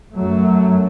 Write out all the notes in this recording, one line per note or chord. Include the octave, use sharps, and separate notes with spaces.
F#2 F#3 A3